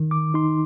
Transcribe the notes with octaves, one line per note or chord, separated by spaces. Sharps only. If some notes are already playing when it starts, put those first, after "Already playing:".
Already playing: D#3
D6
D#4 C6